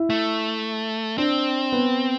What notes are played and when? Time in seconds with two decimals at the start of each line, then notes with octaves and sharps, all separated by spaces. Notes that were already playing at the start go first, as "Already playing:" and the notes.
Already playing: E4
0.10 A3
1.18 C4 D4
1.72 B3